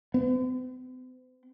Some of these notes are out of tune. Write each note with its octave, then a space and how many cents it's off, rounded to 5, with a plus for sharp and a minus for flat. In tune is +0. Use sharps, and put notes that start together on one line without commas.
C4 -45